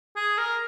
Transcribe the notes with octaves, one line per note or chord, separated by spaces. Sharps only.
G#4
A#4